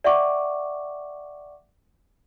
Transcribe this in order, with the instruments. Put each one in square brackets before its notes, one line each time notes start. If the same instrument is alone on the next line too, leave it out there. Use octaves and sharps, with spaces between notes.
[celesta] D5 E5 F#5 G5 C#6 D6